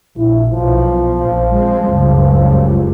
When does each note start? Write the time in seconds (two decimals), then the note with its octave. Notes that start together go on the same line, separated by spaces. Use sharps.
0.18 A#1 E4
0.52 B1 F3
1.16 A#1
1.55 G#3 C4
1.86 F#1 C#2 G2